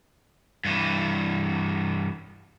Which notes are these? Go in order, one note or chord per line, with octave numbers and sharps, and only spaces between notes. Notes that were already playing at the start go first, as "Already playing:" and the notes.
G2 E3